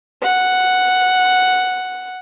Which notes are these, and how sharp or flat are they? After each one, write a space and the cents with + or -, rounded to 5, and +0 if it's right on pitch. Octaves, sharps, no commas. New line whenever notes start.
F#5 +0